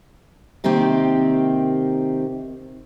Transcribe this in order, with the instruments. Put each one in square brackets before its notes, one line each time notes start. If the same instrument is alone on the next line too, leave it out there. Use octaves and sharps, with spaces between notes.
[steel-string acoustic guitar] C3 D#3 A#3 C4 G4